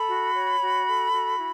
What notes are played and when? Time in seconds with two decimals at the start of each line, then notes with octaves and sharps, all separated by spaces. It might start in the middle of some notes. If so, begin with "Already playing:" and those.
Already playing: A4 B5
0.08 F#4
0.35 C#5
0.61 F#4
0.87 A4
1.12 F#4
1.38 E4